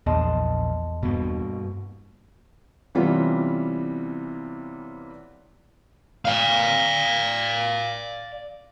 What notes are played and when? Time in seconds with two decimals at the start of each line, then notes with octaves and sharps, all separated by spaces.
0.06 A#1 E2 D#5 A5 C6
1.02 G2 B2 A#3
2.95 C3 E3 G3 B3 C#4 F4
6.25 D5 F5